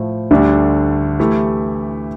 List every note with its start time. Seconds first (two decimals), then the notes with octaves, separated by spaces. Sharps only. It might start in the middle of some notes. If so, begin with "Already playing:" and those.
Already playing: A2 F3 A3
0.31 D2 D3 G3 D4
1.19 E3 A3 E4 G4